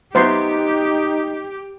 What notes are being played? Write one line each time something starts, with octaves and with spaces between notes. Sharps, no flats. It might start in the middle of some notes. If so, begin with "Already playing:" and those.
F#3 B3 D#4 G4 C5 E5 C6